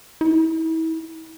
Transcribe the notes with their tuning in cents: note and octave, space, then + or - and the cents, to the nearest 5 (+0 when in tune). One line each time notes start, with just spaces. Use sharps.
E4 -35